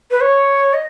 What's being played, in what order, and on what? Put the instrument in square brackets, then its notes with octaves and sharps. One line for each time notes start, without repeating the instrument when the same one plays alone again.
[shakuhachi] B4
C#5
D#5